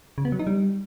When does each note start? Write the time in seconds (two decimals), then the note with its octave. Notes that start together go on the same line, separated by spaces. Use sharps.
0.18 C#3
0.25 B3
0.32 F#3
0.39 D#4
0.47 G3